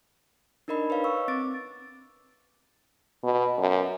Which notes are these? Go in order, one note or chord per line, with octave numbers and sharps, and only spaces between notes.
D4 D#4 A#4 D#5 B5
B4 C#5 F5
C#6 E6
C4 D6 A6 D7
B2
F#2